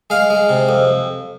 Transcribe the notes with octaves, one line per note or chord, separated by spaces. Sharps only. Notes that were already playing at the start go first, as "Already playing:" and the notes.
G#3 F5
G#3
C3
F2